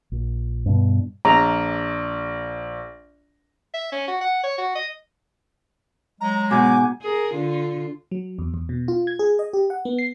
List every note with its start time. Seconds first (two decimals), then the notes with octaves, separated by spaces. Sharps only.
0.12 A#1
0.66 G2 B2
1.25 A#1 A#5
3.74 E5
3.92 C#4
4.08 F#4
4.21 F#5
4.44 C#5
4.58 F#4
4.76 D#5
6.21 F#3 G#3 A#5
6.51 G#2 B2 G#5 D6
7.02 G#4 A#4
7.33 D3 F4
8.11 F#3
8.39 E2
8.54 E2
8.69 B2
8.88 F4
9.07 G#6
9.19 G#4
9.39 D#5
9.53 G4
9.70 F#5
9.85 B3
9.99 C7